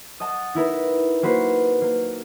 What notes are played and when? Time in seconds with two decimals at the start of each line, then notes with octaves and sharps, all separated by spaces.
0.20 D#5 F#5 A5 D#6
0.55 D#4 E4 A#4 B4
1.23 A#3 F#4 B4 C5
1.81 A#3